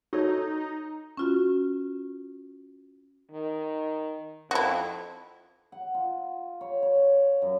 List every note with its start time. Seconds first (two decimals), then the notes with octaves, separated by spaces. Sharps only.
0.13 D#4 F#4 A4 C#5
1.17 C#4 F4 F#4
3.31 D#3
4.51 F2 E4 F#4
5.72 F#5
5.94 F4
6.61 C#5
6.82 C#5
7.42 F#2